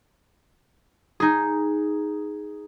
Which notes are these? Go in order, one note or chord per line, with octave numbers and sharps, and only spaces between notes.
D#4 G#4